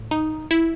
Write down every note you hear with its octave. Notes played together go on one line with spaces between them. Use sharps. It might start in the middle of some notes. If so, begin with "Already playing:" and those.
Already playing: A2
D#4
E4